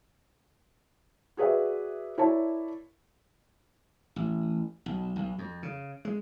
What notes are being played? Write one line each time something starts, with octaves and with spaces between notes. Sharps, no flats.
F#4 G#4 B4 D5 E5
E4 A#4 C#5 D5 A5
A1
B1
B1
F2
C#3
G#3